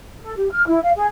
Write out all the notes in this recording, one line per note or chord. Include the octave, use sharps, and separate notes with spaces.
A4
G4
F6
E4
F5
G#4